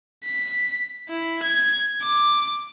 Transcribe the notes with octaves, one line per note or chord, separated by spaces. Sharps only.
B6
E4
G#6
D6